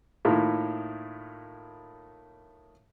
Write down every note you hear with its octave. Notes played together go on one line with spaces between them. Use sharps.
A2 D#3 A#3 E4 F4